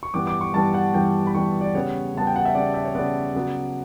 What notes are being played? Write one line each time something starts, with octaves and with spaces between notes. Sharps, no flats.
C#6
G2 E3 G3 B3 D6
D6
C#6
G2 E3 G3 B3 A5
F#5
G2 E3 G3 B3 G5
B5
G2 E3 G3 B3 C#6
D5
C#3 G3 B3 C#5
C#3 G3 B3 A5
G5
F#5
E5
C#3 G3 B3 D5
E5
C#5
C#3 G3 B3 D5
C#3 F#3 B3